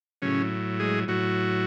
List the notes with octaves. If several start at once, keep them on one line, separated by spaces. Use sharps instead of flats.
A2 C#3 F#3 C#4
G#3 G#4
A2 F#3 F#4